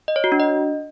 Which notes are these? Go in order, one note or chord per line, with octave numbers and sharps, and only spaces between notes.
D#5
C#5
F#4
D4
D#5